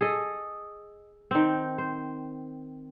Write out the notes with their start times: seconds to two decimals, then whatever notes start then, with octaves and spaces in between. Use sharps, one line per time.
0.01 G#4 A4 D#5
1.31 D#3 C4
1.78 C5